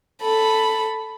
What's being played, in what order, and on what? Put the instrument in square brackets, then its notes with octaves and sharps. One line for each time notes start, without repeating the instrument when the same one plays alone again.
[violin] A4 B5